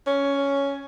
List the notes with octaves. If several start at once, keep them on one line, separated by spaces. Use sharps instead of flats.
C#4